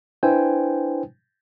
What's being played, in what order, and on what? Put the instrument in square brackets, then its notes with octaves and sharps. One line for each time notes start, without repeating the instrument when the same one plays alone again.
[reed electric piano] D4 E4 B4 C5 G5 G#5